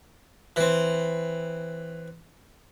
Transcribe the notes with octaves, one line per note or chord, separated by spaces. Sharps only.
E3 C4